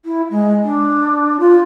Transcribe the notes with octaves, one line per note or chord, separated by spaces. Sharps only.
E4
G#3
D4
F4